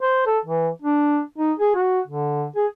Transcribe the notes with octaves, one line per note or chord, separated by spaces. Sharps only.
C5
A4
E3
D4
D#4
G#4
F#4
D3
G#4